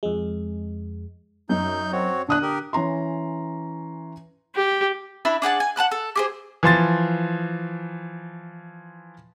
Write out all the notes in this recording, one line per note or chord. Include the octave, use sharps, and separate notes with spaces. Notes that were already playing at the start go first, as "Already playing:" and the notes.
F2 G#3
F#2 D#4 G6
C4 F#4 C#5
D3 D4 D#6 F#6
G4 A#4
E3 C#4 A#5 C6
G4
D4 E4 E5 B5
D4 G#4 F#5 A5
G#5
F#5 A5 B5 F#6
A4
G4 G#4 C5
E3 F3 C6 A6